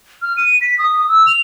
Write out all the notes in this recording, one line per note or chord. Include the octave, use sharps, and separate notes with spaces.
F6
D#7
B6
D#6
E6
F7